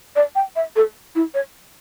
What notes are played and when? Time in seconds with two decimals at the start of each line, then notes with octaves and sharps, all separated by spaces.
0.16 D5
0.35 G5
0.56 E5
0.76 A4
1.15 E4
1.34 C#5